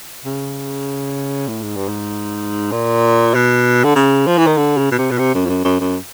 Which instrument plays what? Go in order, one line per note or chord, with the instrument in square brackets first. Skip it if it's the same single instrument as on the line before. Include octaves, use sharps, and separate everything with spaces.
[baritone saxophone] C#3
A2
G#2
G2
G#2
A#2
B2
D3
C#3
F3
E3
D#3
D3
C#3
B2
C3
B2
C3
F#2
F2
F#2
F#2
F#2